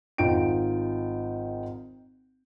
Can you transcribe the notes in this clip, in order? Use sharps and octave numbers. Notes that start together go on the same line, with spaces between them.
G#1 D#4 F4 G5 D7